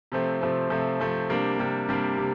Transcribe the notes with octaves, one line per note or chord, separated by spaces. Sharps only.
C3 F3 A3 C4
C3 F3 A3 C4
C3 F3 A3 C4
C3 F3 A3 C4
C3 G3 A#3 D4
C3 G3 A#3 D4
C3 G3 A#3 D4
C3